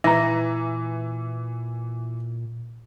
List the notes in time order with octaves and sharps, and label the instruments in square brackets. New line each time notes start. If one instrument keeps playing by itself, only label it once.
[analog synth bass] A#2 [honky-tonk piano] E3 [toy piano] E5 A#5